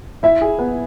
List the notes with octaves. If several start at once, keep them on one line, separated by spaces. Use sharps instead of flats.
E4 E5
G#4
B3